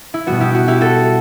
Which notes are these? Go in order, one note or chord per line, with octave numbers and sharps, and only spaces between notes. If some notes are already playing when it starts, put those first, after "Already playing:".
E4
B2 G3 B3 F#4
E4 G4
F#4
E4 G4
F#4 A4